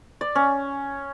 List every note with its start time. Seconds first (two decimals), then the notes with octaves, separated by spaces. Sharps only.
0.21 D5
0.35 C#4